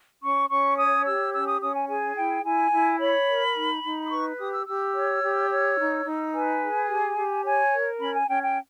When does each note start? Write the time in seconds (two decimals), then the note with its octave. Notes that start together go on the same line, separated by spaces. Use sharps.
0.22 C#4 C#6
0.49 C#4 C#6
0.77 C#5 D#6
1.05 G4 E6
1.33 C#4 E6
1.47 D#6
1.60 C#4 D#6
1.75 G#5
1.88 G#4 G#5
2.16 E4 G5
2.44 E4 G#5
2.72 E4
3.00 C#5 B5
3.28 A#4
3.55 D#4
3.83 D#4
4.06 D#6
4.11 B4 C#6
4.38 G4 D#6
4.52 E6
4.67 G4 E6
4.95 C#5
5.23 G4
5.50 C#5
5.78 D#4
6.06 D#4
6.34 B4 G#5
6.61 G#4
6.89 G4
7.18 G4
7.44 C#5 G#5
7.73 A#4
8.00 C#4 B5
8.14 G#5
8.28 C#4 G5
8.43 G5